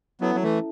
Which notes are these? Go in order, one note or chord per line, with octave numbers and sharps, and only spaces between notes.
F#3 B3 C#4 E4 A4 E5 A5
F#3
E3 A3